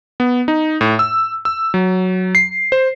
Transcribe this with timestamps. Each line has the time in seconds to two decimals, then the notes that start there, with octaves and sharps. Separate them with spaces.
0.20 B3
0.48 D#4
0.81 A2
0.99 E6
1.45 E6
1.74 F#3
2.35 C7
2.72 C5